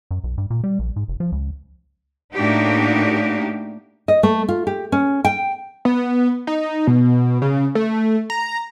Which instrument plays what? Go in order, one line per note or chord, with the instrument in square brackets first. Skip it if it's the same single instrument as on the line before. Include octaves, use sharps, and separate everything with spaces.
[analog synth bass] F#2
B1
G2
A#2
G3
A#1
G#2
F1
F3
C#2
[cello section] A2 A#3 D4 D#4 F#4 G4
[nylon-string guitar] D#5
A3
F4
G4
C#4
G5
[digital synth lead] B3
D#4
B2
C#3
A3
A#5